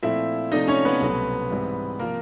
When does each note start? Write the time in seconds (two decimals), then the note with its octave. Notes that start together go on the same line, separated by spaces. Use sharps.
0.03 A#2 F3 A3 C4 E4 E5
0.52 C3 F3 A3 D4 D#4 D#5
0.68 C#4 C#5
0.85 B3 B4
1.00 C2 B2 F#3 A3 C4
1.50 G#2 E3 G3 C4 E4
1.99 C3 F3 A#3 A#4